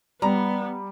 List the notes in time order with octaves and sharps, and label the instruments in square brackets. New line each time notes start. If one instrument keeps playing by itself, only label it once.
[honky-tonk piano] G3 [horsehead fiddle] B3 [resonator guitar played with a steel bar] A#5